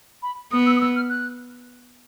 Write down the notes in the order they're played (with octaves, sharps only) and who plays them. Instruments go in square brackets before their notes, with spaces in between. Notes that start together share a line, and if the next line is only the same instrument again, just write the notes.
[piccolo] B5
[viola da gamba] B3 [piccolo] D#6
[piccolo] E6
D#6
E6
F6
F#6